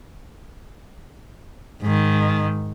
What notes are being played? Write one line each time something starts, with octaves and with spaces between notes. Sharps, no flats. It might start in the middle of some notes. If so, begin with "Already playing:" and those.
G#2 D#3